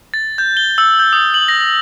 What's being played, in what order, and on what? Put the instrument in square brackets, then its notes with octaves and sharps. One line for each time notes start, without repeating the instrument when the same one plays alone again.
[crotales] A6
G6
G7
E6
G6
D#6
F#7
A#6